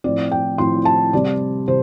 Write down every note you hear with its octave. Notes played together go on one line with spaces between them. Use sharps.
A2 F3 C4 D5
G5
A2 F3 C4 C6
A5
C3 G3 C4 D5
C3 C5